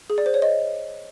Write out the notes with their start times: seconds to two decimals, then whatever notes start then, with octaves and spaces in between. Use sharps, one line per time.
0.10 G#4
0.18 D5
0.26 C5
0.34 C#5
0.42 D#5